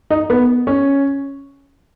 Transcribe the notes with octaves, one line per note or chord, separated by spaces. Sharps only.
D#4
B3
C#4